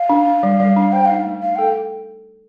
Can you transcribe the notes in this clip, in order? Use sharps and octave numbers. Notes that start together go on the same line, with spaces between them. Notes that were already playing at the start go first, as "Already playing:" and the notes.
Already playing: F5
D4
D4
G3
G3
D4
C5 G5
D#4 F5
A3
D#4 F5
A4 G5